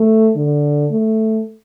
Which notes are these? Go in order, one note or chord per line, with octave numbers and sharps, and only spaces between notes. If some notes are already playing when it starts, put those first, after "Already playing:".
Already playing: A3
D3
A3